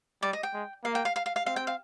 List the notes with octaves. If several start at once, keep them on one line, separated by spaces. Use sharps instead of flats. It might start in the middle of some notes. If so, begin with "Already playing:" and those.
G3 D5
D#5
G5
G#3
A#3 F5
G5
F5
F5
F5
F5
C4 F5
G5
F5